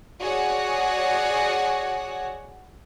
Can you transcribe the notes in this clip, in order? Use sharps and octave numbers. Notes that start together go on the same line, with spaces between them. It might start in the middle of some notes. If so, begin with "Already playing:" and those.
F#4 G#4 C#5 D5 F#5